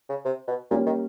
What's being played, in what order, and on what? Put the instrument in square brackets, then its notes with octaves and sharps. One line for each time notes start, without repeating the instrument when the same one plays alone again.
[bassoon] C#3
C3
B2
[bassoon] A#2 [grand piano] G3 A#3 C#4
[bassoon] D#3